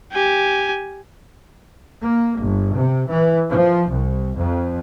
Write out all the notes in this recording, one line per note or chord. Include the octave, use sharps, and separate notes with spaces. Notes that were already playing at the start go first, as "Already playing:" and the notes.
G4 G#5
A#3
G1
C3
E3
F3
C2
F2